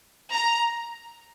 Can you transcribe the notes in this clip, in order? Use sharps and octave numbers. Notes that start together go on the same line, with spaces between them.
A#5